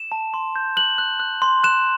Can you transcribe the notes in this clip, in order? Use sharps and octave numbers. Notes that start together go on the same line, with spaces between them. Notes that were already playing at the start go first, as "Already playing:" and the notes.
Already playing: E7
A5
C6
G6
F#6 F#7
F#6
F#6
C6
F#6 E7